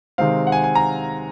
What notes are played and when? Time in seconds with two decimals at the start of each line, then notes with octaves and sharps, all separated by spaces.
0.18 C3 D#3 G#3 C4 F5
0.47 F#5
0.52 G#5
0.64 G#5
0.75 A#5